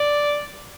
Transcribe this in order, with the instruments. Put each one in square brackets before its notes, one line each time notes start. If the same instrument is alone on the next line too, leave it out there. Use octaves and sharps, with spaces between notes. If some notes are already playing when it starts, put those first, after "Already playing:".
Already playing: [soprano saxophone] D5